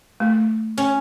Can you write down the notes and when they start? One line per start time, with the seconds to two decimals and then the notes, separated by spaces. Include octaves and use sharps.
0.20 A3
0.78 C#4